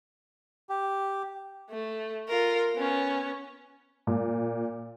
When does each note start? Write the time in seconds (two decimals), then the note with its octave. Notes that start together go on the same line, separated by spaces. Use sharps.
0.69 G4
1.70 A3
2.28 F4 A#4
2.75 B3 C#4
4.07 A#2